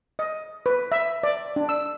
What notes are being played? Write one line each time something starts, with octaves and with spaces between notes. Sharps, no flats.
D#5
B4
E5
D5
D4
E6